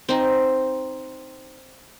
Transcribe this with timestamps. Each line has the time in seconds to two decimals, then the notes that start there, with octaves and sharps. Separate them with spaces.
0.09 C4 D#4